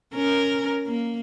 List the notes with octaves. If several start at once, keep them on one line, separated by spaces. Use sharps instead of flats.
C#4 A#4
A#3